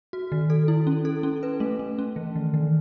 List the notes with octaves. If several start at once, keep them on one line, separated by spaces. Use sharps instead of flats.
F#4
D#3
A4
E4
C#4
A4
C#4
B4
A3
A3
C#4
E3
D#3
D#3